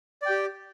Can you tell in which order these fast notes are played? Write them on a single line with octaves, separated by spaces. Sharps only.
D5 G5 G4